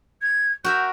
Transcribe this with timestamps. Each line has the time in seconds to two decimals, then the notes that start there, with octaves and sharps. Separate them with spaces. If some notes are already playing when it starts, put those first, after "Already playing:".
0.21 G#6
0.64 F#4 A#4 E5 G6